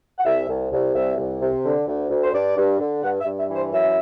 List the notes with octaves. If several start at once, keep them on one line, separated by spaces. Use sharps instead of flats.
F#5
C2 E5
C2
C2
C2 E5
C2
C3
D3
D2
D2
C5
G2 D5
G2
D3
G2 F#5
E5
G2
E5
E3
C5
F#2 E5